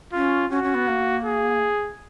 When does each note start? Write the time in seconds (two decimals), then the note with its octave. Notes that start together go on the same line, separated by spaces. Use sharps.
0.13 C#4 F4
0.50 C#4 F#4
0.63 C#4
0.75 B3
0.88 A#3
1.25 G#4